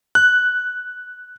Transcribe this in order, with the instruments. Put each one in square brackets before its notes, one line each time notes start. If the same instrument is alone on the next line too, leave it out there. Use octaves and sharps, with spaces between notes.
[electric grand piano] F#6